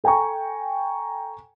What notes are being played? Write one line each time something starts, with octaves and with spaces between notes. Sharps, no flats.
A4 G5 G#5 A#5 C#6